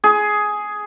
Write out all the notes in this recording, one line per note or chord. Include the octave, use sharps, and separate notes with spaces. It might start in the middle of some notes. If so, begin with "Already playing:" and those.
G#4